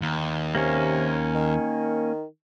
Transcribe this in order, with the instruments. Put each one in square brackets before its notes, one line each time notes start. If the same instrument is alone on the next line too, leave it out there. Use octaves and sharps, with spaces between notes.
[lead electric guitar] D#2
[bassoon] C3 [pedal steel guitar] A#3 C#4
[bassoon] D#3